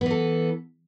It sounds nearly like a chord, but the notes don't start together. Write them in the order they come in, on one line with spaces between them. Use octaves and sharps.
B3 E3 A4